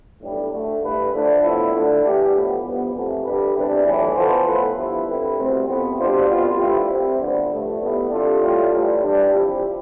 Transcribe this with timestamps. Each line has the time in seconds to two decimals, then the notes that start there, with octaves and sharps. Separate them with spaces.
0.21 B1 A2 G3 D4 A4
0.51 D2 D3 A3
0.81 G2 E3 A3 E4 B4
1.12 D2 D3 F3 A3 D4
1.42 A2 F3 B3 E4
1.73 D3 A3 D4
2.03 E3 A3 D4 G4
2.34 A2 F3 B3
2.63 G2 F3 B3
2.94 F2 C3 E3 A3
3.25 D3 G3 D4 G4 B4
3.55 E2 C3 G3 D4
3.85 B1 A2 E3
4.15 E3 B3 F4 A4 C5
4.46 A2 F3 B3 F4 B4
4.76 G2 F3 B3 E4
5.07 D3 G3 C4 E4 B4
5.37 C2 B2 A3 C4
5.68 F2 C3 F3 B3
5.98 B2 G3 D4 F4 C5
6.28 C2 B2 B3 F4
6.58 G2 F3 A3 E4 G4
6.89 C2 C3 G3 C4 E4
7.19 D2 D3 F3 B3 D4
7.49 G2 F3 A3
7.79 A2 G3 B3 E4
8.10 C3 G3 D4 F4 A4
8.40 A2 G3 D4 F4
8.70 A1 A2 G3
9.02 G2 E3 G3 D4
9.32 C3 F3 C4 E4 G4